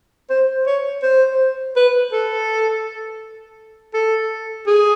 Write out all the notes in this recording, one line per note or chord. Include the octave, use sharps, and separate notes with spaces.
C5
C#5
C5
B4
A4
A4
G#4